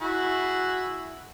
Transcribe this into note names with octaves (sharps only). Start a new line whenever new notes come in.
E4 F#4 G#4